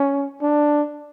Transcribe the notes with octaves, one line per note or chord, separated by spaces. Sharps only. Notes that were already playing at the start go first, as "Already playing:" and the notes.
Already playing: C#4
D4